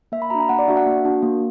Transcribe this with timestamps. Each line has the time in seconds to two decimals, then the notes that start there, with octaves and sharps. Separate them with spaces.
0.12 A#3 E5
0.22 B5
0.30 D4 F#4 A#5
0.40 A#5
0.49 A#3 F#5
0.59 D5
0.68 D4 F#4 E5
0.77 F#5
0.86 A#3
1.05 D4 F#4
1.23 A#3